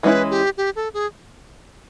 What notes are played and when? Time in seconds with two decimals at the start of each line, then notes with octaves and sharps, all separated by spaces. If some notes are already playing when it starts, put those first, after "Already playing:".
0.03 E3 G#3 C#4 E4 B4
0.31 G4
0.57 G4
0.76 A4
0.94 G#4